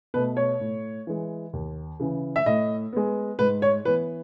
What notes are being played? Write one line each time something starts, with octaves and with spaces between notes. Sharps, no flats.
B2 A3 B4
C#5
A2
E3 G#3
D#2
C#3 E3
E5
A2 D#5
G#3 B3
G#2 B4
C#5
E3 B3 B4